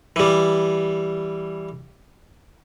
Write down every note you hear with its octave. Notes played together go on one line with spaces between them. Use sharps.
E3 G3